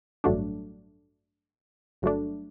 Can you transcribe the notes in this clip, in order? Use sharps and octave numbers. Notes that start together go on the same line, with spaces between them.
A1 G2 F#3 A3 D4
G1 G2 F#3 A3 D4